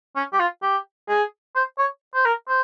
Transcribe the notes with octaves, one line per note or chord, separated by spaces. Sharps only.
C#4
G4
F4
G4
G#4
C5
C#5
C5
A#4
C5